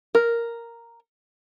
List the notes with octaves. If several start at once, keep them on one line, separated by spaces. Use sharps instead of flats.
A#4